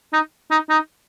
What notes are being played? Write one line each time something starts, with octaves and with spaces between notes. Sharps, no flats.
D#4
D#4
D#4